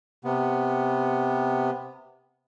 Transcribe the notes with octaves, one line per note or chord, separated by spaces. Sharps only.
C3 B3